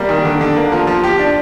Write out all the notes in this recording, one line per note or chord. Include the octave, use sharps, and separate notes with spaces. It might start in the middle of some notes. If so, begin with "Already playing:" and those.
Already playing: C3 G3 A#3
D#3
D3
D3
A#3
F3
F3
G4
D4